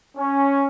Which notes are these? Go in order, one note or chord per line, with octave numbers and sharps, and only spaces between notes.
C#4